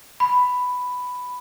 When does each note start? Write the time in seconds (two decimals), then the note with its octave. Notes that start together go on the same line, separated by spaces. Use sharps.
0.20 B5